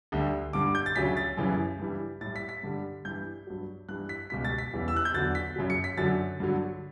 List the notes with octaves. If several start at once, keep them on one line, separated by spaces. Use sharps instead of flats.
D2 D3 G3
G2 D3 G3 D6
G6
A6
D2 C#3 F#3 B6
A6
F#2 C#3 E3 G3
G2 E3 G3
A2 G3 A6
B6
B6
G2 D3 G3
G2 E3 G3 G6
G2 F#3
G2 E3 G3 F#6
B6
C#2 B2 G3 B6
A6
B6
E2 C#3 E3 G3
E6
F#6
G6
E2 D3 F#3 A6
B6
F#2 C#3 F#3
C#7
B6
F#2 D3 F#3 A6
G2 D3 F#3